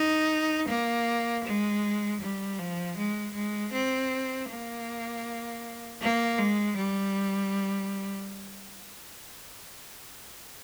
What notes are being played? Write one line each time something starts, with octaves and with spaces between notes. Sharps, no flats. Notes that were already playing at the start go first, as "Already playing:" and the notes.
Already playing: D#4
A#3
G#3
G3
F3
G#3
G#3
C4
A#3
A#3
G#3
G3